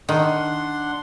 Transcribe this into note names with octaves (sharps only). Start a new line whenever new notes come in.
D#3 D4 F#5 C6